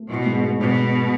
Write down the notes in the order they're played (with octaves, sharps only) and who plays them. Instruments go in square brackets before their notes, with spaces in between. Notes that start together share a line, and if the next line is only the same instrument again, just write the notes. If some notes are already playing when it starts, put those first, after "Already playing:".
Already playing: [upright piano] A3
[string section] B2 [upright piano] E4
[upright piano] G#2
A3
[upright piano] G#2 [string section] B2
[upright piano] G#2
B3